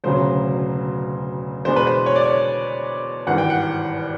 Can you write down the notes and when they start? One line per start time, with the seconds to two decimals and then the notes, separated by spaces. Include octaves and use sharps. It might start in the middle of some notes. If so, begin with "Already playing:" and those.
0.04 E1 D2 C#3 F#3 C5
1.65 E2 B2 G#3 B3 D4 C5
1.76 B4
1.87 C5
2.06 C#5
2.16 D5
2.25 C#5
3.27 G#1 G2 E3 F#5
3.38 G5
3.50 F#5